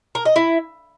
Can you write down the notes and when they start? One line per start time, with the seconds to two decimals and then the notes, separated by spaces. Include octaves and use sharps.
0.15 A#4
0.25 D#5
0.36 E4